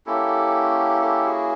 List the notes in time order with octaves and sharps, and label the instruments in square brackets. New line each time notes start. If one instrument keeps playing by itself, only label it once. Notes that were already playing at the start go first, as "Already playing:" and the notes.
[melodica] A#3 C#4 E4 G4 A4
G4 A4
F#4 G#4